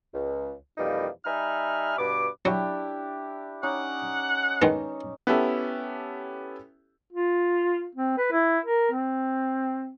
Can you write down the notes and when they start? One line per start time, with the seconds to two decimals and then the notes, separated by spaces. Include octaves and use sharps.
0.14 C#2
0.77 F2 B2 E3 G3 A#3 D#4
1.25 G3 D#4 E5 G#5 B5 F6
1.98 G2 B2 B4 D6
2.45 F#3 D4 E4 G4
3.63 C#4 D#4 F#5 D6
4.62 D#3 G#3 B3
5.27 B3 C#4 E4 G4 A4
7.12 F4
7.95 C4
8.18 B4
8.32 E4
8.65 A#4
8.91 C4